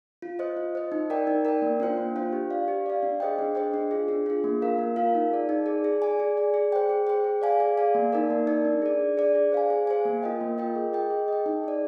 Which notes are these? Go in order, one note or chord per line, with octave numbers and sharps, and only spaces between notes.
F4
C5 D#5
F4
C5 D#5
D#4
A#4 D5 G5
D#4
A#4 D5 G5
A#3
D4 F4 C5 G5
A#3
D4 F4 C5 G5
G4
D5 F5
G4
D5 F5
D4
G#4 C5 D#5 G5
D4
G#4 C5 D#5 G5
D4
F4 G#4
D4
F4 G#4
A#3
F4 A#4 F5
A#3
F4 A#4 F5
D#4
G#4 D5
D#4
G#4 D5
G#4
D5 G#5
G#4
D5 G#5
G#4
C5 G5
G#4
C5 G5
G#4
D5 F5 G#5
G#4
D5 F5 G#5
A#3
D#4 A#4 D5
A#3
D#4 A#4 D5
D4
G#4 D5
D4
G#4 D5
G#4
C5 F5 G#5
G#4
C5 F5 G#5
A#3
F4 A#4 D#5 G5
A#3
F4 A#4 D#5 G5
G#4
D#5 G5
G#4
D#5 G5
D#4
G#4 D5